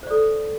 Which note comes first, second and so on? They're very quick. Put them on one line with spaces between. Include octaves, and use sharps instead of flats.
C5 D5 A4